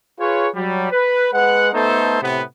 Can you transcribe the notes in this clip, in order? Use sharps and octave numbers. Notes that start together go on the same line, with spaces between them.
F4 G#4 B4 C#5
F#3 G3
B4
G#3 B4 F#5
A3 B3 D#4 A4 C5
A2 C3 B3